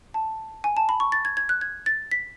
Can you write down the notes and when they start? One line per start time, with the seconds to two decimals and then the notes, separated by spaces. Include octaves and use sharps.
0.14 A5
0.64 G#5
0.77 A5
0.89 B5
1.00 C#6
1.12 A6
1.25 G#6
1.37 G#6
1.49 F#6
1.61 G#6
1.86 A6
2.11 B6